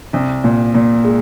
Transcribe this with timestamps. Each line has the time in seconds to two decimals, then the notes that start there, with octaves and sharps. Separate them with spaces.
0.13 C2
0.44 A#2
0.74 A#2
1.04 G#3